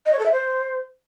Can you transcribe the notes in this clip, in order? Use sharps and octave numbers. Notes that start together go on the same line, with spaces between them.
D#5
C#5
A4
E5
C5